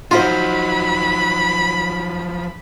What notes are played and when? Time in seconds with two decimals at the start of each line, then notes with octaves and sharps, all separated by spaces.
0.11 F3 F#3 D#4 F4 F#4 C5 B5